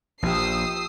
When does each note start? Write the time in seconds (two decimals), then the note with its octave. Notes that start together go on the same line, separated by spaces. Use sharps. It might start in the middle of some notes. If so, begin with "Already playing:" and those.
0.23 A#1 F3 G4 D#6 E6 C7